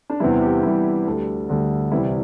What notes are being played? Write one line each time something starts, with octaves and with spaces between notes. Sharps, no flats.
D4
E2 C3 E3 G3 E4
G4
E2 C3 E3 G3 E4
D2 D3 G3
D2 D3 G3
C2 C3 E3 G3 E4